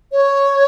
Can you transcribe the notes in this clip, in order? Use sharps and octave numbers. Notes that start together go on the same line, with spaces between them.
C#5